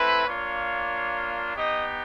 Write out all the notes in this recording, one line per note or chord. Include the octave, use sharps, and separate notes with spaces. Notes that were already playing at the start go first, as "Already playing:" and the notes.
Already playing: A3 C4 E4 B4
A#3 D4 F4 C#5
B3 D#4 G4 D#5